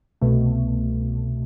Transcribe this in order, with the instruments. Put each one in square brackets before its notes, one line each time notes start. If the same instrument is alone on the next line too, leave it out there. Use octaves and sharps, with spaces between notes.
[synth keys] C2 B2 A3